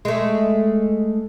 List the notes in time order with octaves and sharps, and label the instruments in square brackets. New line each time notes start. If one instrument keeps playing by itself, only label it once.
[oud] G#3 A3